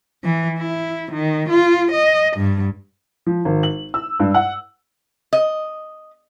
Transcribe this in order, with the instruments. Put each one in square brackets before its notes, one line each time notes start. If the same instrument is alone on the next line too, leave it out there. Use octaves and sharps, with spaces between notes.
[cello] E3
E4
D#3
F4
D#5
G2
[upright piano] F3
G#1
F#7
E6
G2
F#5
[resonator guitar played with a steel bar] D#5